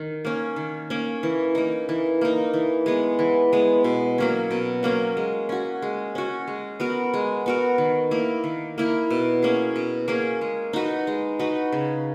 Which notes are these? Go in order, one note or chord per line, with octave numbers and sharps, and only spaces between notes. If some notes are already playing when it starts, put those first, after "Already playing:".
Already playing: D#3
A#3 C#4
D#3
A#3 C#4
E3
A#3 D#4
E3
A#3 D#4
E3
G#3 B3
E3
G#3 B3
B2
F#3 A#3 C#4
B2
F#3 A#3 C#4
G#3
C#4 F#4
G#3
C#4 F#4
G#3
B3 F#4 A#4
G#3
B3 F#4 A#4
D#3
A#3 E4 A#4
D#3
A#3 E4 A#4
B2
A#3 C#4 G#4
B2
A#3 C#4 G#4
G#3
D#4 F#4 B4
G#3
D#4 F#4 B4
C#3